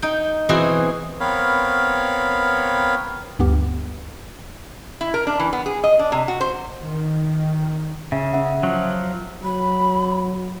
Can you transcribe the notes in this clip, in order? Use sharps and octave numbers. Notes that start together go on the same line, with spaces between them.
D#4 G5
B2 E3 C4 F#4 G#4
B3 C4 A#4 C#5 F5 B5
D2 G2 B3 G4
E4
A#4
D4
E3
B3
G#4
D#5
D4
C3
F#4
C5
D#3
C#3 E5
C#4 E5 F#5
F3 F#3
F#3 B5